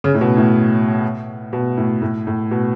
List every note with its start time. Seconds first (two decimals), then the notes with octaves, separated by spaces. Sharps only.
0.04 C#3
0.14 A2
0.21 B2
0.37 A2
1.53 B2
1.77 A2
2.02 A2
2.27 A2
2.51 B2